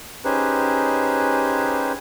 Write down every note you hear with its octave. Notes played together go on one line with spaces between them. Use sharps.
C#4 D#4 G4 G#4 B4 C5